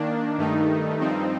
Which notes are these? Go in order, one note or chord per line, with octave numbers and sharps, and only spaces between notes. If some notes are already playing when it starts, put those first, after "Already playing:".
Already playing: D#3 A#3 D4
G2 D#3 A3 D#4
G2 F3 C4 D#4